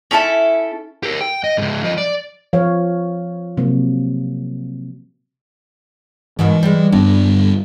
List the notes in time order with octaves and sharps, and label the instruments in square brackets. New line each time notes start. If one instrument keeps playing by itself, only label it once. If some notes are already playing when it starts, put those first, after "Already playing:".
[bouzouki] C#4 E4 A4 E5
[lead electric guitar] G4 A#4
G5
D#5
G#2 C#3
F3 D#5
D5
[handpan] F3 C#5 F5
C3 F#3 A#3
[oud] G#2 B2 D#3 [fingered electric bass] E3
[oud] G3 G#3
[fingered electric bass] G1 B3 D4 [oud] G2